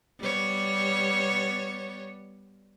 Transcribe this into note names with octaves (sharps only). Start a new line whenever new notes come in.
G3 B3 C#5